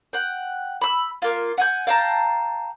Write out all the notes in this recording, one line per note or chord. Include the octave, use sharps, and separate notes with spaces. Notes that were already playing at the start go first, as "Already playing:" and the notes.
F#5 G5
B5 E6
A#3 F4
F#5 G#5 G6
F5 G5 A5 A#5